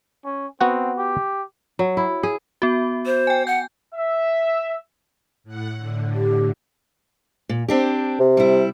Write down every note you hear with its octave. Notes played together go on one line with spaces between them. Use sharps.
C#4
B3 C4 F#4 F#5
G4
F#3
E4
G#4
B3 F#4
C5
G5 G#5
F#5 G6
E5
A2 F#5
A2 D3
G4
A#2
C4 D4 G4
C3
G3 E4